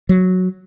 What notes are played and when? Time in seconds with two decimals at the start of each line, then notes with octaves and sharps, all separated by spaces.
0.09 F#3